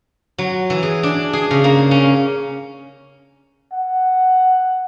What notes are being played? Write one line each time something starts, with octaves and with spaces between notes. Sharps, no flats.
F#3
E3
G#4
D4
G#4
C#3
A#3
C#4
F#5